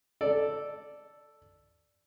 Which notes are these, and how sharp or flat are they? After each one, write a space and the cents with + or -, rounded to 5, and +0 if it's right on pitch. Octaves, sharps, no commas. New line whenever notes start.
A4 +0 D5 +0